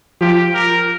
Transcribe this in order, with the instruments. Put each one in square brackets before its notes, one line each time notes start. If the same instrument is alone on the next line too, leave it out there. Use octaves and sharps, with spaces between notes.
[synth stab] F3 [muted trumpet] G4
[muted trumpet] A#4